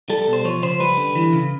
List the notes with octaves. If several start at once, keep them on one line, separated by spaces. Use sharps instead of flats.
G3 A4
A4
B2
C5
F3 C#5
C#3 C5
G3 B4
D3
E3
C#3